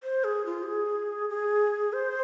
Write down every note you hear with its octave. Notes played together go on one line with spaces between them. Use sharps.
C5
G#4
F4
G4
G#4
G#4
C5